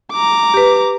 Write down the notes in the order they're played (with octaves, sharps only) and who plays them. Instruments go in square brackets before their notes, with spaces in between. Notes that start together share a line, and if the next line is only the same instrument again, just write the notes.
[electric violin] A#5 D6
[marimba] G4 B4